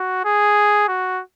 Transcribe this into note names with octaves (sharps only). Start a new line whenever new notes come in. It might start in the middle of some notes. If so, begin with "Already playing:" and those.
Already playing: F#4
G#4
F#4